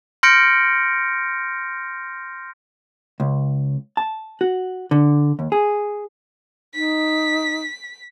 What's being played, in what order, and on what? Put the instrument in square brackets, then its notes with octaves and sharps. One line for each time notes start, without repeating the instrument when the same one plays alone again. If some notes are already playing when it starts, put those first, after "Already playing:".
[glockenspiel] C6 F6 G6 A#6 C#7 D7
[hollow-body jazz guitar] C#2
A5
F#4
D3
D#2
G#4
[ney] D#4 [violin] B6